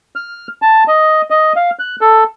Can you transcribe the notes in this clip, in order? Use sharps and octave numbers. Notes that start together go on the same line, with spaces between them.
F6
A5
D#5
D#5
F5
F#6
A4